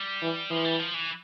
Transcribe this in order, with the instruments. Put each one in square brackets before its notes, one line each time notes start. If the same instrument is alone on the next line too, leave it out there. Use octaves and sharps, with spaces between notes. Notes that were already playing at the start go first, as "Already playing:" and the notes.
Already playing: [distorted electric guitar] G3
[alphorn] E3
[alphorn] E3 [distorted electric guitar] F3
[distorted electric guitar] G3
F3
E3